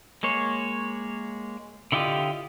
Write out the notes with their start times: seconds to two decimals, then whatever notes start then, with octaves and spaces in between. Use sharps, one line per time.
0.23 G#3 A#3 C#5
1.92 D3 E4 F4 G4 D#5